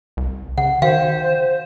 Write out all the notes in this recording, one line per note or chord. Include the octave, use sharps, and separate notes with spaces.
C2
C#3 F#5
D#3 F#4 C5 F5 G5